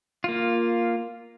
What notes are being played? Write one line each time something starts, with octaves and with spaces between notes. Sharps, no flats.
A#3 F4